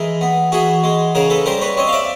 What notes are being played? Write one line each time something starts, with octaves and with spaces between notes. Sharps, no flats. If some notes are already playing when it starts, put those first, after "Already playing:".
Already playing: E3 G#3 G#4 A#4
B3
E3 F#4 G#4
G#3
C#3 G#4 A#4
A4 B4
G3 A#4 C5
B4 C#5
C4 C#5 D#5
F5
D5 E5